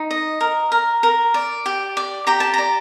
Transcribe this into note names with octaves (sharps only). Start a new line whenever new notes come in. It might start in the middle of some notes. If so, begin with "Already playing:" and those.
Already playing: D#4
D#5
A#4
A#4
A#4
D5
G4
D5
G4 A#5
A5
D5 A#5